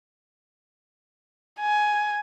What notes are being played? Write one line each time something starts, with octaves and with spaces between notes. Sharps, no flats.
G#5